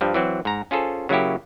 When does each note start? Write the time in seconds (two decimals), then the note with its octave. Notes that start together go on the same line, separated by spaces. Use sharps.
0.01 G2 F3 G3
0.14 E3 F#3 C4
0.45 G#2 A#5
0.71 C#4 F4 G#4 A4 C5
1.09 C#3 F#3 A#3 E4 G4